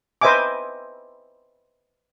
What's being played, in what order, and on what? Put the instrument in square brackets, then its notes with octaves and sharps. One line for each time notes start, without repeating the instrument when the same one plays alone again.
[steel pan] B4 C5 D#5 E5 G#5 D6